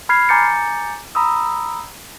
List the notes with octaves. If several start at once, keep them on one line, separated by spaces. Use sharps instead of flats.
B5 F6 G#6 C7
G#5 A#5 D6 G6 A6 C#7
A#5 B5 D#6 E6